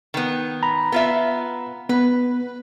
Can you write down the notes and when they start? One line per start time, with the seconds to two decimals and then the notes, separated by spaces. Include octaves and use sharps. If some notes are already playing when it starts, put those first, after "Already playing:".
0.14 D#3 B3
0.63 A#5 B5
0.92 B3 F4 E5
1.89 B3 B4